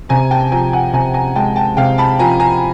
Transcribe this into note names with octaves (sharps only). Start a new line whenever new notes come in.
C3 G#5 A#5
G5 A5
F3 G#5 A#5
F#5 G#5
C3 G#5 A#5
G#5 A#5
G#3 G5 A5
G5 A5
C3 F5 G5
A5 B5
F3 G#5 A#5
G#5 A#5